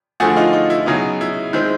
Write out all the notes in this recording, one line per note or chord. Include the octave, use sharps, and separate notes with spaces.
D3 F3 A3 F#4 G#4
D#4 F4
D#4
E4
C#3 F#3 B3 D#4
E4
D#3 G#3 C4 E4